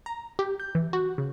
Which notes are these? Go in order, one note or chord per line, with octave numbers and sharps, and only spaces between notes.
A#5
G4
G6
E3
F#4
C#3